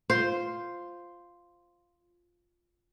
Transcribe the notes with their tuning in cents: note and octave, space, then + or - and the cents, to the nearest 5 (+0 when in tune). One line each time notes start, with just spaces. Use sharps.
F4 +0 C5 +0